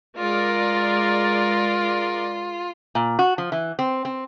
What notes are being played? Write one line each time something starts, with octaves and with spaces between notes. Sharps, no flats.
G#3 F4 A#4 D5
A#2
F#4
F3
E3
C4
C4